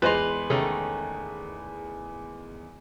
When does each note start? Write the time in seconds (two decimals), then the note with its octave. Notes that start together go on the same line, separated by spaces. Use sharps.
0.02 E2 G#3 F4 B4 C5 D#5 C6 F7
0.50 C3 D#3 A3 C#4 G#4 A4